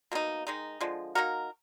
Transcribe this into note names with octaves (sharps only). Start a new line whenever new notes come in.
B2 A#3 D#4
D#3 G#3 D#4
D3 F3 G#3
A#3 D#4 F#4 A#4